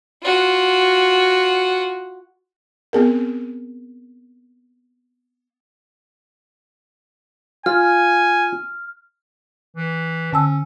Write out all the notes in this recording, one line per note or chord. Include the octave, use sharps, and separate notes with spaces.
F4 F#4
B3 C4 G#4 A#4
F4 G#5 F6
E3
D3 C#4 A5 E6